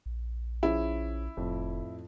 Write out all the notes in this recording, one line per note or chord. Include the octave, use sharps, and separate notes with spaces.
A#1
F3 C#4 E4 G#4
F1 F2 A2